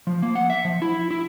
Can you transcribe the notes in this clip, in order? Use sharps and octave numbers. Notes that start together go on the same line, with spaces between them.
F3
A#3
F#5
E5
F3
E4
E4